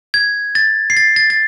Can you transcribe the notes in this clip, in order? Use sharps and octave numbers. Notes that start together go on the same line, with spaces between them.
G#6
A6
C7
A6
A6
A6